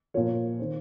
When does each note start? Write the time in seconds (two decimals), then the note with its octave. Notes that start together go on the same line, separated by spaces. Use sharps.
0.14 A#2 F3 C#5
0.59 D#3 C5